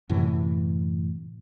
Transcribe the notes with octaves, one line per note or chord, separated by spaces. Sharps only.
F#2 A2 C3 E3